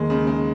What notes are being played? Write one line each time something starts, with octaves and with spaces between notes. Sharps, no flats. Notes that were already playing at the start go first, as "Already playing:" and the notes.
Already playing: D#2 D#3 G#3 A#3
C#3
G#3